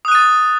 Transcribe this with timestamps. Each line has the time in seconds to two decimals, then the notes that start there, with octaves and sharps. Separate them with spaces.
0.05 D#6
0.08 F#6
0.12 D#7
0.15 A6